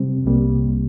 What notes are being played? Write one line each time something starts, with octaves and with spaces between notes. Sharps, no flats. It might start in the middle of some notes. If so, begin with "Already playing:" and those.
Already playing: C3 G3 C4
C2 C3 G3 A#3